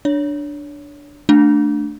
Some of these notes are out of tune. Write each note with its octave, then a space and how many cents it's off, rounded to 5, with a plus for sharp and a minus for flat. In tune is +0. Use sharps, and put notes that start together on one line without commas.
D4 +0 C#5 +20
A3 +0 D4 +0